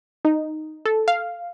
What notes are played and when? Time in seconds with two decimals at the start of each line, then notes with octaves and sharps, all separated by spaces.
0.25 D#4
0.85 A4
1.08 F5